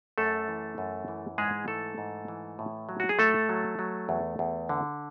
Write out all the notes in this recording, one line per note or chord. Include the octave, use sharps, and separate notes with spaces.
F#2 A3 A4
E3
F#2
E3
G#2 G#3 G#4
E3 A3 A4
G#2
E3
A2
F#3
F#4
G#4
A2 A3 A4
F#3
F#3
E2
E2
D3